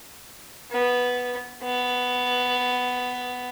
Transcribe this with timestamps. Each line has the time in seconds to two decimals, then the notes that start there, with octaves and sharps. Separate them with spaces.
0.71 B3
1.63 B3